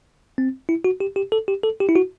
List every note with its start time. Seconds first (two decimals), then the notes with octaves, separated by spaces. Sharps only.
0.38 C4
0.69 E4
0.84 F#4
1.00 G4
1.16 G4
1.32 A4
1.48 G4
1.63 A4
1.80 G4
1.89 E4
1.96 F#4